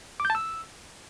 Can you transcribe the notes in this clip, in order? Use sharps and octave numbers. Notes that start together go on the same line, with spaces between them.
D6
G6
A5
E6